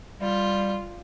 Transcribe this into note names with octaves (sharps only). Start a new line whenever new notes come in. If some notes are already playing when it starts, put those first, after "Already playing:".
G3 F4